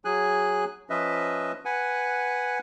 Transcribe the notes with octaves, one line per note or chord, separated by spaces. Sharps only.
F#3 G#4 G#5 F#6
F3 C#4 B4 D#5 E5
B4 F#5 G#5